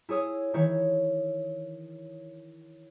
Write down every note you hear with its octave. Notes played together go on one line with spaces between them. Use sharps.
E4 G#4 C#5 D#6 E6
D#3 E3 E4 C#5